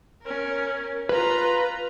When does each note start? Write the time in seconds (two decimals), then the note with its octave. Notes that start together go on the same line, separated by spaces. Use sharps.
0.22 C#4 A#4
1.09 F4 B4 A#5